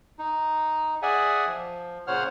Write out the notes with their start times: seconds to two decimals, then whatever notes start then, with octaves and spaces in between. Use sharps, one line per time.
0.19 D#4
1.02 G#4 D5 E5 F#5 G#5
1.47 F3
2.07 A#2 C#3 C5 C#5 F#5 F6